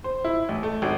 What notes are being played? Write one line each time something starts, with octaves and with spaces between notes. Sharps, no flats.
C5
E4
A1
A3
G#1